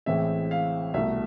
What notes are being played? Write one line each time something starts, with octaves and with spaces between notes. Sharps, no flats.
A1 A2 E3 G#3 C4 E5
F5
C2 B2 A3 E5